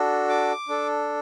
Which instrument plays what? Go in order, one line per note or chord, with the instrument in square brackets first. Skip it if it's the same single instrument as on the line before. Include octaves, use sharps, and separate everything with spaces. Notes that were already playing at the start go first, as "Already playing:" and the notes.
Already playing: [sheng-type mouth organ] D4 F#4 A4
D6
D4 A4